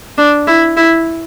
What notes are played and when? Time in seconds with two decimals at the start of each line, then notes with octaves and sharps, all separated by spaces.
0.18 D4
0.47 E4
0.77 E4